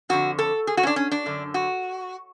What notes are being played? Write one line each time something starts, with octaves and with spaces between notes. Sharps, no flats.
F2 D3 F#4
A4
G#4
F#4
C#4
D4
C#4
D4
F#2 D3
F#4